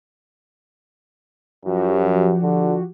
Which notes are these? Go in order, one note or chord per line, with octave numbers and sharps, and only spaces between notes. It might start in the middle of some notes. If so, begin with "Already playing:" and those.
F#2 F3 F#4 G4
D3